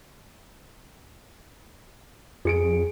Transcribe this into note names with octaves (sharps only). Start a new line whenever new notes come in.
F2 G#4 C#7 D7